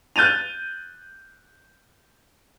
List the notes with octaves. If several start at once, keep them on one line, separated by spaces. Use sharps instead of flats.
F#6 G6 A6 D#7 F7